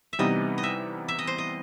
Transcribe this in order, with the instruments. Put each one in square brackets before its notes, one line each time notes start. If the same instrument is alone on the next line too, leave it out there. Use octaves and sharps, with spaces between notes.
[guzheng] E5
[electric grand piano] C3 E3 G3 B3 D#4 [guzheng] D#5
[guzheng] D#5
E5
E5
D#5
C5
D#5